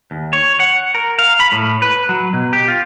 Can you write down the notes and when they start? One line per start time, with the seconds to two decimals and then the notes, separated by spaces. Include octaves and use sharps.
0.11 D#2
0.33 C#5
0.60 F#5
0.95 A#4
1.19 F5
1.40 B5
1.52 A2
1.82 B4
2.09 F#3
2.33 B2
2.53 G4
2.68 F4